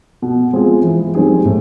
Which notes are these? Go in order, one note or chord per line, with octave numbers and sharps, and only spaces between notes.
B2
G#3 C4 F4 G#4
E3
G3 C4 D#4 G#4
A2